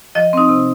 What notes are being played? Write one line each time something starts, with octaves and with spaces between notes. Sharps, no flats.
F3 D#5
C4 D#4
C3